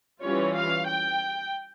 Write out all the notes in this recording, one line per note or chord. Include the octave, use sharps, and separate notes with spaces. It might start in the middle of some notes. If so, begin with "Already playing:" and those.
E3 G3 C#4 F4 C#5
F5
G5